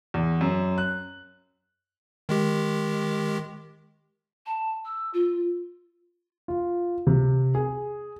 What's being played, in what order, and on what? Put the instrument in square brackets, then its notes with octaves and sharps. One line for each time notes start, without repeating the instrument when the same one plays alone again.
[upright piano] E2
F#2
F#6
[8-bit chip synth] D#3 G#3 G4
[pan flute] A5
E6
F4
[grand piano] F4
C3
G#4